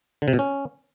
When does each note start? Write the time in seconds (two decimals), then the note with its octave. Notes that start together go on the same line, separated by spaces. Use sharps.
0.22 D3
0.28 C3
0.33 B2
0.39 C#4